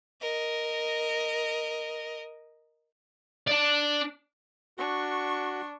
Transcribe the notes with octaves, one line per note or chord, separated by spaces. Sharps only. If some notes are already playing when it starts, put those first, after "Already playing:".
A#4 D#5
D4 D5
D4 F#4 C#6